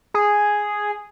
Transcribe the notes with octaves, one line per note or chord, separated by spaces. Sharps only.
G#4